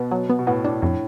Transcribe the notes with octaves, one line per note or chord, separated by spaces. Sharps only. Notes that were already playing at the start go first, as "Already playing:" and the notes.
Already playing: B2 B3
F#3
B3
B2
A2 B3
A2 D4
F2 A2